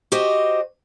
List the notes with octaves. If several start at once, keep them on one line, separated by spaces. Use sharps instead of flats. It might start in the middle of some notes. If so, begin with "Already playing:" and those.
F#4 G4 C5 D#5